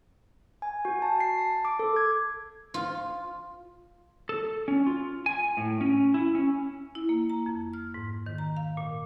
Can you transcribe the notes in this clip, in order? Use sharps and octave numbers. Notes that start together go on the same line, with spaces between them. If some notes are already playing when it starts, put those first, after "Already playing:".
G#5
F#4
A5
C7
A5
D6
A4
G#6
F4
A4
C#4
F4
G#5
A2
C#4
E4
C#4
E4
A#3
A#5
F2
F6
G#2
D#3
A#5
F5
A#2